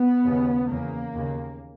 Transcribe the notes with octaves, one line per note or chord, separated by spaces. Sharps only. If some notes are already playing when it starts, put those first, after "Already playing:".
Already playing: B3
D#2 C#3
E2 C#3 A#3
D#2 C#3